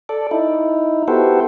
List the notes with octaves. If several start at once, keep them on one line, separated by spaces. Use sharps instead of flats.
A4 D5
D#4 E4
B3 E4 F#4 G4 A4 C5